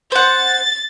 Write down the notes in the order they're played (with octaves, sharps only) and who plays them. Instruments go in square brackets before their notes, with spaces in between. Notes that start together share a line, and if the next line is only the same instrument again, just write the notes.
[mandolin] C5 F#5 [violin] A6